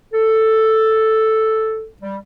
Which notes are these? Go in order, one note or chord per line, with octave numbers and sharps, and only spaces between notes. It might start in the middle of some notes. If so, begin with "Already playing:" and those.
A4
G3